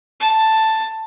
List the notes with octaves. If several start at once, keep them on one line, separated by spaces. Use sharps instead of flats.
A5